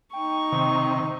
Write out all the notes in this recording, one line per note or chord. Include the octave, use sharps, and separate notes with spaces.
D#4 G5 C#6
C3 D#3